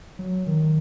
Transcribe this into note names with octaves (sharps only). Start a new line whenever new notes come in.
F#3
D#3